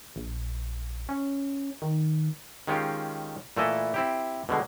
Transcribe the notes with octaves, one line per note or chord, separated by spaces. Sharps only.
A#1
C#4
D#3
D#3 G#3 C#4 F4 G4
A#2 E3 A3 E4 A4 D#5
C4 E4 G4
B2 D3 G#3